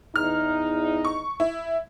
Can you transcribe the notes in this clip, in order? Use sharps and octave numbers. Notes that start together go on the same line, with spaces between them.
E2 D#4 F6
C#6
E4